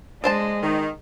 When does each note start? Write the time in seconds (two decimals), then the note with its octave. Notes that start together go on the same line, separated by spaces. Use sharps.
0.24 G#3 D4 C5 D#5 A5
0.63 D#3